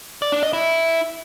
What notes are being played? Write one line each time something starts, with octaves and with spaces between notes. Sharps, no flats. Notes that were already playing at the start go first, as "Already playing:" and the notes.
D5
D4
D#5
E4